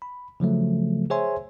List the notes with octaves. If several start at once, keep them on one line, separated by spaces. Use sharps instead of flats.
B5
C#3 F3 F#3 A3
G#4 C5 C#5 E5 G#5 C6